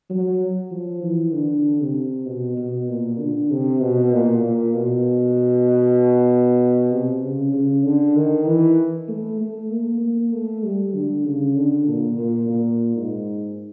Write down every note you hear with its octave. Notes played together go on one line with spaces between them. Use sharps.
F#3
F3
E3
D3
C3
B2
B2
A#2
D3
C3
B2
A#2
A#2
B2
C3
C#3
C#3
D3
D#3
E3
A3
A3
A#3
A#3
A3
G3
D3
C#3
D3
A#2
A#2
A#2
G#2